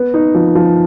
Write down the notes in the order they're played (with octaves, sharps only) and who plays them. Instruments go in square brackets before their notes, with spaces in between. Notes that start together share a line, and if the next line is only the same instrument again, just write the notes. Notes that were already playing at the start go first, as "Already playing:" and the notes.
Already playing: [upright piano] B3
D#4
F3
F3